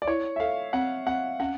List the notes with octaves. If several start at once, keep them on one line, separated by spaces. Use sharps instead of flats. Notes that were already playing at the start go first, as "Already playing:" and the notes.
D5
E4 C#5
E5
A4 F5
C4 F#5
C4 F#5
C#4 F#5